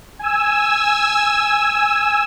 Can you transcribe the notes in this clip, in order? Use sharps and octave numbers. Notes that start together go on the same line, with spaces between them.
G#5 E6